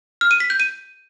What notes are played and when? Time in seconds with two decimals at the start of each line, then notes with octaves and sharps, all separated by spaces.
0.21 F6
0.31 D#7
0.40 B6
0.50 G6
0.60 D#7